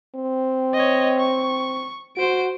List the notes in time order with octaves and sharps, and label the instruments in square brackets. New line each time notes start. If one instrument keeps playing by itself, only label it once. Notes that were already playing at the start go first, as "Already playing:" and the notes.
[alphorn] C4
[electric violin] C#5 D#5
C#6
[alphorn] F#4 [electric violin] C5 D7